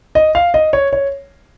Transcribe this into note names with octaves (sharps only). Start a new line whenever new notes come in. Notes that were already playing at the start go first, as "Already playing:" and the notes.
D#5
F5
D#5
C#5
C#5